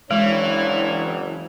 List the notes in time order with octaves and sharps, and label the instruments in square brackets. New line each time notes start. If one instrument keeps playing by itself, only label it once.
[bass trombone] F#1 [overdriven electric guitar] E3 [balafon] G#3 [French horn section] C4 D4 C#5